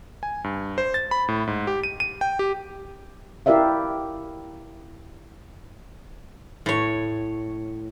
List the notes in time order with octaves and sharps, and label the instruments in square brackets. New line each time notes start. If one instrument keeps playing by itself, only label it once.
[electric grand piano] G#5
G2
C5
A6
B5
A2
G#2
G4
D#7
D#7
G5
G4
[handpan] E4 G4 A#4 D5 E5 F5
[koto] A2 C#5